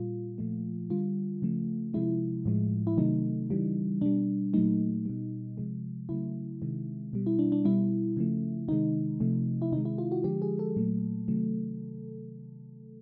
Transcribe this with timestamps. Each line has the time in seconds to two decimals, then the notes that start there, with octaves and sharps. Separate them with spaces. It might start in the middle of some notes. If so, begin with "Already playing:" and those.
Already playing: A#2 G3 F4
0.38 A#2 F3 A3
0.90 D3 G3 F4
1.42 C#3 F3 A3
1.94 C3 F3 G#3 E4
2.46 A2 F3 G#3
2.87 E4
2.97 C3 D#3 F#3 A3 D#4
3.50 C#3 E3 G3
4.01 B2 G3 D4
4.53 A#2 F#3 A3 D#4
5.05 B2 G3
5.57 C3 F3 G#3
6.09 C#3 F#3 A3 E4
6.62 C3 D#3 G#3
7.13 B2 G3
7.26 E4
7.39 D4
7.52 D4
7.65 B2 G3 E4
8.17 C#3 F3 A3
8.68 C3 D#3 G#3 D#4
9.20 C3 F3 A3
9.62 E4
9.72 C3 D#3 G#3 D#4
9.85 E4
9.98 F4
10.12 F#4
10.24 D3 F3 G#3 G4
10.42 G#4
10.59 A4
10.77 A#2 F#3 A3
11.28 C3 D#3 F#3 A3